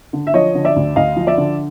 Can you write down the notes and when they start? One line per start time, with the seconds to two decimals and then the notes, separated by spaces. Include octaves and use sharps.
0.13 D3
0.27 E5
0.34 F3 C#5 D#5
0.54 D3
0.65 D5 E5
0.76 D2
0.96 D2 D#5 F5
1.16 F3
1.27 D5 E5
1.37 D3